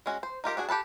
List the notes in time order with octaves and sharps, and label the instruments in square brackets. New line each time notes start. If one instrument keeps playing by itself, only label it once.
[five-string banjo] G#3 C#4 F#4
C5
D#4 F4 G4 A#4
D4 F#4 G#4
G4 A4 B4 A5